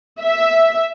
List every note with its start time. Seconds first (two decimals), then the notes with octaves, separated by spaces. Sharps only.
0.20 E5